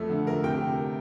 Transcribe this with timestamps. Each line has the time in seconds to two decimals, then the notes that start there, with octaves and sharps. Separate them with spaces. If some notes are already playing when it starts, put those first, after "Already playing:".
Already playing: F2 F3 A3
0.10 D3
0.27 A3 A#4
0.43 C3 G5